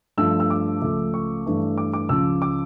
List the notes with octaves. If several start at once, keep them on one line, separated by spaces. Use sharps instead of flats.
G2 F3 A3 E6
E6
D6
C#2 C#3 F3 A3
C#6
G2 E3 A3
D6
D6
C#2 C#3 F3 E6
D6